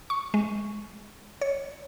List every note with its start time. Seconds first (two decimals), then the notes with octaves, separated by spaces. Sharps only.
0.10 C#6
0.34 G#3
1.41 C#5